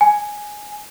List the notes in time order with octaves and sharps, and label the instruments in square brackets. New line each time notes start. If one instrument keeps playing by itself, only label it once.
[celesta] G#5